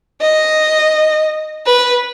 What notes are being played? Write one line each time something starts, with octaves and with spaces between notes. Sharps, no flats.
D#5
B4